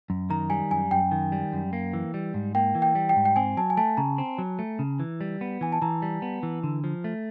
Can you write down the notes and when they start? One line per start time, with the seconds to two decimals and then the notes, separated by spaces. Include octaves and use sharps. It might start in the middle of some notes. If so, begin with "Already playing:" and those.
0.10 F#2
0.30 D#3 A#5
0.50 G3 G#5
0.71 F#2 G#5
0.91 F#2 G5
1.12 D#3
1.32 G3
1.53 F#2
1.73 A#3
1.93 E3
2.14 G3
2.34 G#2
2.55 A#3 G5
2.75 E3
2.82 G5
2.95 G3
3.09 G5
3.16 G#2
3.25 G5
3.36 C4 G#5
3.57 F#3 A5
3.70 G#5
3.77 A3 A5
3.97 C#3 A#5
4.18 C4
4.38 F#3
4.59 A3
4.79 C#3
5.00 E3
5.21 G3
5.41 B3
5.61 E3 G#5
5.72 A5
5.82 E3 A#5
6.02 G3
6.22 B3
6.43 E3
6.63 D3
6.84 F3
7.04 A3